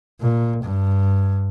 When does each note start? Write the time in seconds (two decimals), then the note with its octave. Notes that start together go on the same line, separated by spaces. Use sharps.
0.21 A#2
0.63 G2